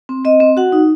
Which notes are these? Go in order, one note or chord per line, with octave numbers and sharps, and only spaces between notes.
C4
C4 D#5
C4
F#4 F#5
D#4